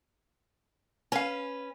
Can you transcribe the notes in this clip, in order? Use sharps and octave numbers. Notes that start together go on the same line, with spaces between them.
C#4 B4 F5 G#5